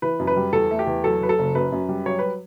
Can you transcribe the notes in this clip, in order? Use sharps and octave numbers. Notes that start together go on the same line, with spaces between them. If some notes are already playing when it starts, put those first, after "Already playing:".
E3 B4
F#2
B4
G3
E2 A4
A3
G4
E2
F#3 A4
F#3 B4
A4
F#1
F#2 B4
F#2
G3
F#3 C#5
B4